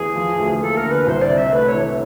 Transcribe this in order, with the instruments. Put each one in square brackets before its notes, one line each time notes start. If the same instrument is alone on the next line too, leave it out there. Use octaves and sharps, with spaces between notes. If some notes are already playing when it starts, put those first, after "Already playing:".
Already playing: [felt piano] E2 [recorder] G#4
[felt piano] F3
D2
[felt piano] A#3 [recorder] A4
[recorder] A#4
[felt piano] D3
[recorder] B4
[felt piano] C2 [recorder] C5
[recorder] D5
[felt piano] C3
[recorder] E5
[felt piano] A3 [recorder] B4
[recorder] C#5
[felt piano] E3